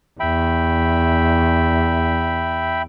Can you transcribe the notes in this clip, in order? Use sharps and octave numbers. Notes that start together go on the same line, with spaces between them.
E2 E5 G5 B5